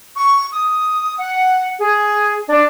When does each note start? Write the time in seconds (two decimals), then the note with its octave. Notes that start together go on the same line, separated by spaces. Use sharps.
0.16 C#6
0.53 D#6
1.19 F#5
1.78 G#4
2.50 D4